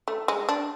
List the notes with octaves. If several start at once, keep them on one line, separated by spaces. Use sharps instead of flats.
A3
G#3
D4